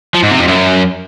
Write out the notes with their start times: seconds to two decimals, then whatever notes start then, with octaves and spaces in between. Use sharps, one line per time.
0.15 F3
0.23 G#2
0.31 C3
0.39 F2
0.48 F#2